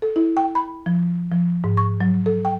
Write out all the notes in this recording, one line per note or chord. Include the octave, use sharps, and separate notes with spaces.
A4
E4
G5
B5
F3
F3
G#2
C#6
F#3
A4
G5